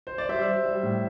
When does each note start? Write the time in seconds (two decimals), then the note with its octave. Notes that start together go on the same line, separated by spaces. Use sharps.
0.07 C5
0.18 D5
0.29 G3 C5 E5
0.47 G3
0.66 G3
0.83 A2